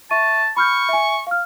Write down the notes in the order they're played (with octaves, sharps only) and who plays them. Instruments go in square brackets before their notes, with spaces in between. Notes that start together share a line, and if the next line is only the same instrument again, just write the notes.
[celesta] E5 C#6 D#7 [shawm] A5
[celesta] B5 F6 G6 [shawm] C#6
[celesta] E5 G#5
F5 F6